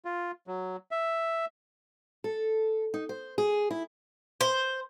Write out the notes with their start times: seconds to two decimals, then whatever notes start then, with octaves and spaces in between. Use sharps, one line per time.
0.05 F4
0.47 F#3
0.91 E5
2.24 A4
2.94 D#4
3.09 C5
3.38 G#4
3.71 E4
4.41 C5